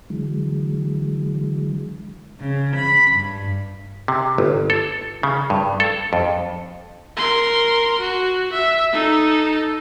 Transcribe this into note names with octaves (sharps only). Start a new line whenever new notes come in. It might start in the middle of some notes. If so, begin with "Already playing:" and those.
D3 E3 F#3 G#3
C#3
B5
G2
C3
G1
A4
C#3
G2
A4
F2
A#4 C6
F#4
E5
D#4 A4